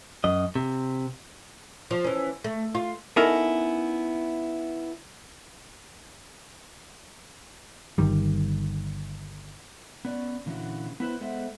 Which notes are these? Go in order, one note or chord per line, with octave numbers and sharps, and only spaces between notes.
F#2 D#5
C3
F3
E3 C#4
A3
F4
B3 C#4 D#4 E4 A4 A#4
G1 D#3 G3
B3 C#4 D5
A#2 D3 E3 B3 C#4 F#4
B3 E4 B4 C5
G#3 B3 A4 C5 E5 F#5